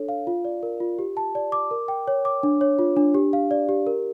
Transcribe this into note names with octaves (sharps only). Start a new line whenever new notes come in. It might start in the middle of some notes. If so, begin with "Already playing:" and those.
Already playing: D4 A4 C#5
F5
F4
D5
A#4
F4
G4
A5
D5
D6
A#4
G5
C#5
D6
D4
C#5
F4
D4
G4
F5
D5
G4
A#4